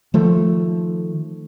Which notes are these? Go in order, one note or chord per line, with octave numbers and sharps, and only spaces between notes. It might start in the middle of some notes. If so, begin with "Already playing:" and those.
D#3 F3 A3